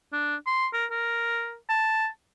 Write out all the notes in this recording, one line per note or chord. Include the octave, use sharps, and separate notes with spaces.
D4
C6
A#4
A#4
A5